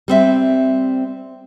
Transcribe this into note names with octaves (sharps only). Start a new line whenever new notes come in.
G3 C4 E5